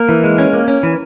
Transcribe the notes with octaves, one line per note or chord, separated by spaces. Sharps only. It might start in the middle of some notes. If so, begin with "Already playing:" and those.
Already playing: A#3 A#4
E3
G#3
C#4
A#3
C#4
E3